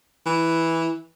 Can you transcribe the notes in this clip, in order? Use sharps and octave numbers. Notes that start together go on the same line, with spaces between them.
E3